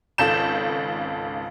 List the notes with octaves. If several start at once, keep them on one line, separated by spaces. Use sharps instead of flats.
G#1 C#2 A4 G6 E7